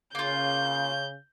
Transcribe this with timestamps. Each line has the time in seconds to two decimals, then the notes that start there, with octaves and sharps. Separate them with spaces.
0.15 C#3 A#3 F4 G6